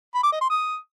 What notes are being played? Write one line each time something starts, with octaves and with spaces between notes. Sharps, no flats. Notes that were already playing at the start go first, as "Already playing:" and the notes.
B5
D6
D#5
C6
D#6